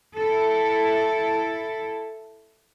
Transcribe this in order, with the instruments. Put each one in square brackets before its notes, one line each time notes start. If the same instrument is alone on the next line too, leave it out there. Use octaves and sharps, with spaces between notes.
[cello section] E4 A4